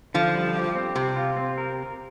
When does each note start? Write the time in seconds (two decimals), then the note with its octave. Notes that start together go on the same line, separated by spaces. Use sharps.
0.14 D3 F3
0.35 G3
0.56 G4
0.76 C4
0.96 C3 C4
1.16 F4
1.37 C4
1.58 A#4